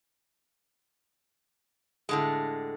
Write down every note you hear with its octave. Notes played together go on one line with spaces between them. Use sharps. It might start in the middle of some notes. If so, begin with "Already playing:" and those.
A2 D3 G#3